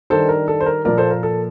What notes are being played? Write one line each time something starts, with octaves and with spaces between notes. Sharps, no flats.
D#3 G3 D4 A4 C5
A#4
A4
C5
A#4
A#2 F3 A#3 A#4 D5
A4 C5
A#4
A4